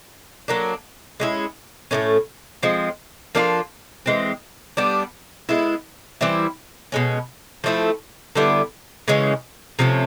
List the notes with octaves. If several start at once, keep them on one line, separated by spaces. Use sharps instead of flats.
F#3 A#3 D4
G#3 C#4 E4
A2 E3 A3 C#4
F3 G#3 C4
F3 A#3 D4 F4
E3 G#3 C4
G3 B3 D4
G#3 B3 E4
E3 G3 C4 E4
B2 G#3 C#4
F3 A3 C4 E4
D3 G3 B3 E4
C#3 E3 G#3 C#4
C3 F3 A3 C#4